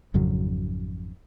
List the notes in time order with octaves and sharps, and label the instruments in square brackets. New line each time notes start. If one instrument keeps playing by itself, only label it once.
[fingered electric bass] G#1 F2 C#3 F#3